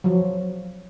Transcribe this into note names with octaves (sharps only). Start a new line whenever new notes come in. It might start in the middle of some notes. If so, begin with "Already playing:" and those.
F3 F#3